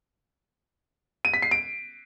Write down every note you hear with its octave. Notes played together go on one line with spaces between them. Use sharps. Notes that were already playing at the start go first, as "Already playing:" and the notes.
D#7
B6
C7
D7